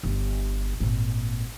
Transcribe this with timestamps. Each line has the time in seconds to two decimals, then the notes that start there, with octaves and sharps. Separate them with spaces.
0.03 G1
0.80 G#1 A#2